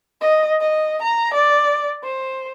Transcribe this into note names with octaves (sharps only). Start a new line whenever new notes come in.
D#5
D#5
A#5
D5
C5